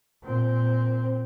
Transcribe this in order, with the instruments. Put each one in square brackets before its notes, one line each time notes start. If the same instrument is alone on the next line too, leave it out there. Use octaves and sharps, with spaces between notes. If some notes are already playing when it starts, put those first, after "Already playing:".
[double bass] A#2 C4